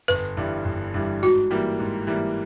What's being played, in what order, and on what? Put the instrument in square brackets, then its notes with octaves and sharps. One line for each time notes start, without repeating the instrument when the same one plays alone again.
[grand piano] G1 [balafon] B4
[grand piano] G2 E3 G3
G1
G2 E3 G3
[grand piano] G#2 [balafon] F#4
[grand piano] E3 G3 A#3
G#2
E3 G3 A#3